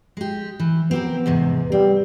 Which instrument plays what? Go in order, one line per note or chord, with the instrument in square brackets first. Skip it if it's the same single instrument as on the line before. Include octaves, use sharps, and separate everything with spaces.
[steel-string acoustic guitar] G#3 G4
E3
[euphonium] B3 [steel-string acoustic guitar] C4 G4 A#4
[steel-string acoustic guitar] E2 G#2 C3
[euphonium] G3 [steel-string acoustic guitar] C4